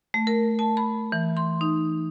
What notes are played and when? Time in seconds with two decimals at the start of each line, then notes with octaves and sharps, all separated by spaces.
0.14 A3
0.27 A#4
0.59 A5
0.77 B5
1.12 E3
1.37 C6
1.61 D#4